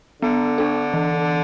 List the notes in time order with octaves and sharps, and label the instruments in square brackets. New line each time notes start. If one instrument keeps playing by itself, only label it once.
[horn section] D3 [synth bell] B3
[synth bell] D4 A4
E3